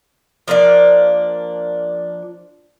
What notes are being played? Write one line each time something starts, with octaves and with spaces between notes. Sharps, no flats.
F3 A#3 D4 D5